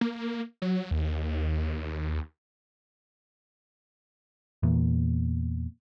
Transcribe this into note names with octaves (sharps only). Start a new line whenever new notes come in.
A#3
F#3
D#2
E2 A#2